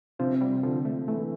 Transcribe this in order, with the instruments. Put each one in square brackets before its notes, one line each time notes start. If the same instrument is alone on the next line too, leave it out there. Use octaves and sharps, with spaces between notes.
[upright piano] C3 [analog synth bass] F3
[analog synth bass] G3
[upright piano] D3 [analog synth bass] F3
[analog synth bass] A3
[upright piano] E3 [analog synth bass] A3